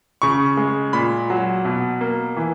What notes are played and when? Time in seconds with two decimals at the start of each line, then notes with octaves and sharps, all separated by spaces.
0.22 C#3 C#6
0.57 G#3
0.93 A#2 B5
1.30 F#3
1.65 B2
2.01 A#3
2.37 E3